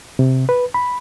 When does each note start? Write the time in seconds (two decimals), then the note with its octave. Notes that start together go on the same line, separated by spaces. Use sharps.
0.19 C3
0.49 B4
0.74 B5